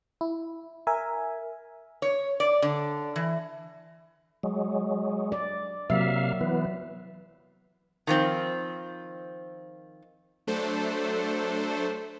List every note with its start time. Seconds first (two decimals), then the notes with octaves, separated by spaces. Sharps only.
0.21 E4
0.87 A#4 E5 G#5
2.02 C#5
2.40 D5
2.62 D3
3.16 E3
4.43 F#3 G#3
5.32 D5
5.90 C3 F#3 A#3 E5 F5
6.41 E3 B3
8.07 D#3 F3 C4
10.47 F#3 A3 D4 A4 C5